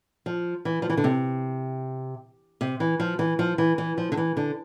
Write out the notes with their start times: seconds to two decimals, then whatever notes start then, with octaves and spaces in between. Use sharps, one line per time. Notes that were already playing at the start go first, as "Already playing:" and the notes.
0.26 F3
0.65 E3
0.82 F3
0.90 E3
0.97 D3
1.04 C3
2.61 C3
2.80 E3
3.00 F3
3.19 E3
3.39 F3
3.58 E3
3.78 E3
3.98 F3
4.12 D3
4.17 E3
4.37 D3